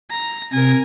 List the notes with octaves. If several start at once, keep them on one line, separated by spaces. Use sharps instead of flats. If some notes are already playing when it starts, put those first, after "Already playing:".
A#5
C3 A#4 G#5